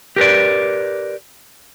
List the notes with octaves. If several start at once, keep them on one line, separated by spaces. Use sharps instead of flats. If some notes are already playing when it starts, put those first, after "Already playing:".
G4 A#4 B4 D5